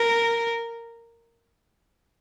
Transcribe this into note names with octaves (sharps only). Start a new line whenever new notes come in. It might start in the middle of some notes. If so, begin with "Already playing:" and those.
Already playing: A#4